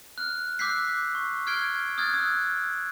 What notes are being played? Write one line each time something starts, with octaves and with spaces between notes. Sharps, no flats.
F6 F#6
D6 E6 F#6 G6 B6 C7
C#6
F6 F#6 G#6 C7 D7 G7
D#6 F6 F#6 G#6 A6
D#6 E6 F#6